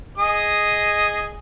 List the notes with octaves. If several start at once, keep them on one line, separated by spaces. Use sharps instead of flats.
G#4 D#5 D#6